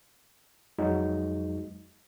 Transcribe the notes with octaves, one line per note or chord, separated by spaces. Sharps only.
F2 F#3 G#3 D#4